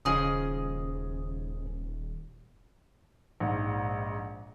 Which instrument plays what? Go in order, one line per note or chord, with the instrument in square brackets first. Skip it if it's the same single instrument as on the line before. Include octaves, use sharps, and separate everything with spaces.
[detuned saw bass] D#1 [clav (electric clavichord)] C#3 F3 [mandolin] G#4 D#5
[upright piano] A#1 G#2